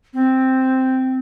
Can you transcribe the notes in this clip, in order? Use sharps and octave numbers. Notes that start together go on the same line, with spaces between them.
C4